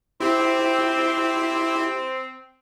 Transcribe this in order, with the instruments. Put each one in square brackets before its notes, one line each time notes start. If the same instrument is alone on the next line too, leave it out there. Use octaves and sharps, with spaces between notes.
[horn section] C4 [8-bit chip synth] E4 G4